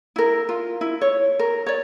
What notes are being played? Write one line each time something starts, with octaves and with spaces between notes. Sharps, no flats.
E4 A#4
F4
E4
C#5
A#4
C#5 D5